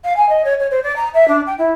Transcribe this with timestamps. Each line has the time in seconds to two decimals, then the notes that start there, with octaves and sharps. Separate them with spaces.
0.04 F5
0.17 G#5
0.29 D#5
0.45 C#5
0.60 C#5
0.71 C5
0.83 D5
0.96 A#5
1.14 E5
1.28 D4
1.47 G5
1.58 E4